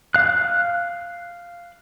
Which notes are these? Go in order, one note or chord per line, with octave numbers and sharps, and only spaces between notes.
F5 F#6